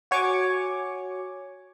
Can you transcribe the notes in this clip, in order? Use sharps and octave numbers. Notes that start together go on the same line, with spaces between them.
F#4 C#5 G#5 C#6 D6